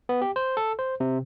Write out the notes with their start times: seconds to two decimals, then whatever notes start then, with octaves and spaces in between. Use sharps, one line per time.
0.09 B3
0.21 G4
0.36 C5
0.57 A4
0.79 C5
1.00 C3